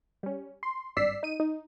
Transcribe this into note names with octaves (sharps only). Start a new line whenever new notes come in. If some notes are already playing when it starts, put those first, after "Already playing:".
G3 C#4
C6
G#1 G2 D5 E6 B6 C7
D#4 D#7
D#4